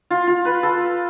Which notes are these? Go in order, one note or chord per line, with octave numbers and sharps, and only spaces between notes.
F4
F4
B4
A4